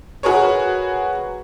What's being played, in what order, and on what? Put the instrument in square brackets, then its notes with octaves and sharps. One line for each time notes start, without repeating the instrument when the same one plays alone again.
[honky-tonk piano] F#4 G#4 A#4 B4 C#5